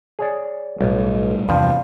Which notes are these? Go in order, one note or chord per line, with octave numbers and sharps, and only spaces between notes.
G#4 C#5 D5
B1 A2 G3
E2 G2 C3 F3 F5